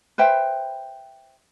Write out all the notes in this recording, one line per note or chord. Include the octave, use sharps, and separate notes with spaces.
B4 C5 E5 G5